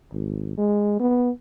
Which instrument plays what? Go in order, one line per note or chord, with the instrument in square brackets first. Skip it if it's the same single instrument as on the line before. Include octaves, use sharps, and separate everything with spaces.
[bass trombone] G#1
G#3
B3